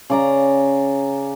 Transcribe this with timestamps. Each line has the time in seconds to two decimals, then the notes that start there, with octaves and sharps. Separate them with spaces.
0.10 C#3 D5 A#5